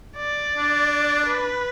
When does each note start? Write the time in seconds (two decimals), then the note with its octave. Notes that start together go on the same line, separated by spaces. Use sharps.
0.17 D5
0.57 D4
1.26 B4